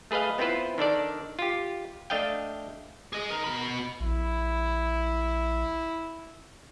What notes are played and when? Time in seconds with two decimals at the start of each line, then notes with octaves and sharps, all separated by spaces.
0.11 A3 G#4 B4 D#5 F5
0.38 B3 C4 E4 F4 B4 C5
0.78 D#3 D4 A4 D5
1.39 F4 G4
2.10 A3 D4 D#5 F5 G5
3.13 G#4 D#5
3.31 D#4 A#4
3.44 B2 B5
4.00 A#1 E4